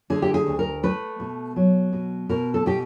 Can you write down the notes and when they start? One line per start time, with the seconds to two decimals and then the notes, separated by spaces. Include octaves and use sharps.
0.10 D3 G#4
0.22 G4
0.34 G#4
0.47 D2
0.59 A#4
0.83 A3 B4
1.20 B2
1.56 F#3
1.93 B2
2.29 B2 A#4
2.54 A4
2.66 B2 G4